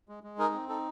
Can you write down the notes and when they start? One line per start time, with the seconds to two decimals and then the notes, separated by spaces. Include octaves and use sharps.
0.09 G#3
0.23 G#3
0.38 D#4 G#4 A#4
0.54 C4
0.69 D#4 A4